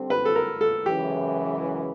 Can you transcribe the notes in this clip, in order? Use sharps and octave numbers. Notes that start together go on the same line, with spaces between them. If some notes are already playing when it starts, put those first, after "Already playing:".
Already playing: D3 G3 C4
B4
A4
A#4
A4
F#2 C#3 E3 G#3 G4